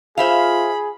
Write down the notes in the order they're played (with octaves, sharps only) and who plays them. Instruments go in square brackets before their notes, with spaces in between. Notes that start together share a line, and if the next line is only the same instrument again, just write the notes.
[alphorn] F4 [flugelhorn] G#4 [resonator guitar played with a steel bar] C5 E5 F5 [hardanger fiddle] B5